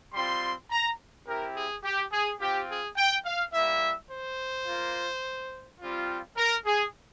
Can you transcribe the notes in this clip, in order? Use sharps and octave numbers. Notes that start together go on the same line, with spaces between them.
G3 C4 F4 C6
A#5
C4 E4 G4 A#4
G#4
G4
G#4
C4 F4 G4
G#4
G5
F5
G3 A#3 E4 E5
C5
A#3 F4
G3 C4 F4
A#4
G#4